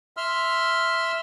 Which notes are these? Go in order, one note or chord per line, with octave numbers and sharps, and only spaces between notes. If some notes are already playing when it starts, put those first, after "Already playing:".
E5 C6 E6 F6